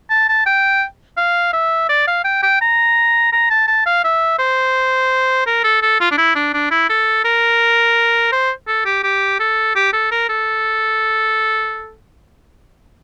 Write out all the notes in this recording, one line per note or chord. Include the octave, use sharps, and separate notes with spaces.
A5
A5
G5
F5
E5
D5
F5
G5
G5
A#5
A#5
A5
A5
F5
E5
C5
A#4
A4
A4
F4
D4
E4
D4
D4
E4
A4
A#4
C5
A4
G4
G4
A4
G4
A4
A#4
A4